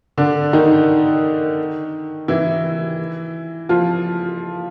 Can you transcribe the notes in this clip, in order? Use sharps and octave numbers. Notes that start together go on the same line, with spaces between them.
D3 D4
D#3 D#4
E3 E4
F3 F4